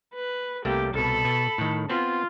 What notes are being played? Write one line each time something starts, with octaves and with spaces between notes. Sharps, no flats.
B4
C2 A3 A#3 G4
C2 B2 A4 B5
B2
A2 D#3
B3 C4 F4